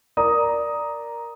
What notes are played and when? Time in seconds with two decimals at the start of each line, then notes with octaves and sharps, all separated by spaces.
0.17 A#4 D5 A#5 D#6